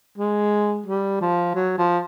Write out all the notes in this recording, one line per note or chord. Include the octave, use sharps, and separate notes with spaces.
G#3
G3
F3
F#3
F3